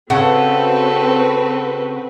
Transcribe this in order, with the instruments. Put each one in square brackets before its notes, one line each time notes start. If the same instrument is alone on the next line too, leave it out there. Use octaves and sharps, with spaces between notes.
[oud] C#3 [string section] C4 F#4 B4 [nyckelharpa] A4 [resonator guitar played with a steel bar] F#5